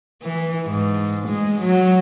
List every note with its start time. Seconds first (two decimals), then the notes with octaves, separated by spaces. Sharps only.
0.22 E3
0.67 G#2
1.28 G#3
1.61 F#3